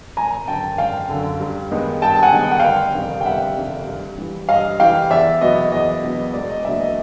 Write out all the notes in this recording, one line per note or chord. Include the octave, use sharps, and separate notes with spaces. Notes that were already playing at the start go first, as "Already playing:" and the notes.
G#1 G#5 A#5
F#2 D3 G5 A5
G#1 F5 G5
F#2 D3
G2
D#3 G#3 B3
G2 G5 A5
A5
F#5 G#5
D#3 G#3 B3
G5
F#5
G1 F5 G5
F2 C3 D#3 G3
G5
G1 E5 F#5
F2 C3 D#3 G3
G2
E3 G3
G2 D#5 F5
E3 G3 F5 G5
E2 D5 E5
B2 F#3 B3 D#5
E2 D#5
B2 F#3 B3
E1 D5
D#5
D2 D3 F#3 A#3 D5 E5
D#5